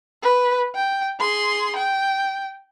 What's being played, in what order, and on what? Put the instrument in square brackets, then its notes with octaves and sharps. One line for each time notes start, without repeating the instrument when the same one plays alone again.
[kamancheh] B4
G5
G#4 C6
G5